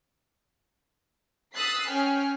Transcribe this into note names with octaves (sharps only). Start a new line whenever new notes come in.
D#6 E6 F#6 A6 B6 C7
C#4 G5 G#5 F6